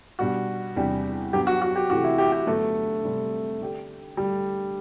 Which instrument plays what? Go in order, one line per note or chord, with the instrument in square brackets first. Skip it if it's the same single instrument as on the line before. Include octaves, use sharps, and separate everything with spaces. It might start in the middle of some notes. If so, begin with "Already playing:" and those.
[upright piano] B2 G3 D4 [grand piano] F#4
[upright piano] E2 C3 G3 D4 G4
[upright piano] G2 F#3 B3 [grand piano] G4
[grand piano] F#4
F#4
G4
[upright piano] C3 E3 A3 [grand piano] F#4
[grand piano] E4
G4
G4
[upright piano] G2 D3 F#3 B3 F#4 [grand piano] A3
[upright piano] C3 G3 C4
D3 A3 D4 G4
[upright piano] G2 D3 A3 [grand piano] G3